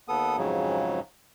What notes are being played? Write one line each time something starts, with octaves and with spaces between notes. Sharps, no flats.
D#2 B3 A4 D#6
F2 G#2 C#3 F#3